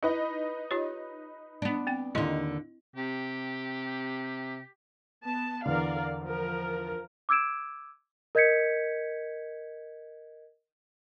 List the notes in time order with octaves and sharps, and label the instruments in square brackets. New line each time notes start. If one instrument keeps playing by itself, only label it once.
[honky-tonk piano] D#4 B4 D#5 [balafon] E4
[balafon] F4 G4 C#5
[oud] B3 D4
[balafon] C4 G5
[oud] D#2 D3 [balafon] E4 D#5 C6
[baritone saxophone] C3 [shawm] G4
[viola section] B3 A5
[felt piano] E2 D3 [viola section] A#4 D5 F5
[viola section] F3 A#4
[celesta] D6 E6 G#6 D7 E7
A#4 D#5 G6 G#6 B6 C#7